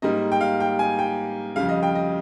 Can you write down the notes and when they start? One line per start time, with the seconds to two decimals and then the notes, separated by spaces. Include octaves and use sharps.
0.02 G#2 G3 A#3 D#5
0.32 G5
0.41 F5
0.60 G5
0.79 G#5
0.99 G5
1.56 F2 C#3 G3 F5
1.69 D#5
1.83 G5
1.95 D#5